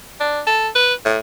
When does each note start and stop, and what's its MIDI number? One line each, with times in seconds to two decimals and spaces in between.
0.20 0.41 62
0.46 0.68 69
0.75 0.94 71
1.05 1.18 45